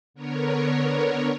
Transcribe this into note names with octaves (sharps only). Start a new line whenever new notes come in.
D3 B3 A#4 C#5